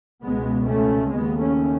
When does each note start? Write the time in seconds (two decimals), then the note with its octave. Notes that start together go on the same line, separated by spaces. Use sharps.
0.23 C#2 B2 G#3 B3
0.66 A3 C#4
1.10 D#2 C#3 G#3 B3
1.39 A3 C#4